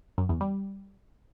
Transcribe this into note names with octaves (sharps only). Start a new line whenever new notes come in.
F#2
E2
G3